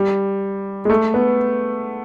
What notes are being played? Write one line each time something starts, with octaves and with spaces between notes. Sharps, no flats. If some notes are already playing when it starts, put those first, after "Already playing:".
Already playing: G3
G#3
A3
B3